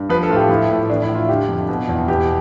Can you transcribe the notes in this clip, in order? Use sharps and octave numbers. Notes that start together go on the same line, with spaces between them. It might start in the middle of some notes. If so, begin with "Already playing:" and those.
Already playing: G2
F3 B4
A4
A2 F4
G4
F3 E4
A2
E3 D4
E4
A2
F4
D3 G4
F2
B2
E2
B2 G4